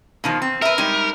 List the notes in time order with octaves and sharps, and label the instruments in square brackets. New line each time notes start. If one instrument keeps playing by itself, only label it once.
[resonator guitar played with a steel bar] B2 D#3 F3
C4
[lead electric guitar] A#4 [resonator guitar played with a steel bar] B4 E5
[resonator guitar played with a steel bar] G3 G#3 D#4